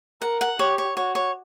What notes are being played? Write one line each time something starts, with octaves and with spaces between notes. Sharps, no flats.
A#4 F#5
F#5
G4 C#5
C#5
F#4 C#5
C#5